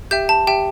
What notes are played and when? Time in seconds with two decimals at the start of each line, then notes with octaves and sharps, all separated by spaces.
0.11 G4 E5 G5 G6
0.29 A5
0.47 G4 E5 G5